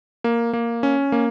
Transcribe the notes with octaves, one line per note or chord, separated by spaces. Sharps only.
A#3
A#3
C#4
A#3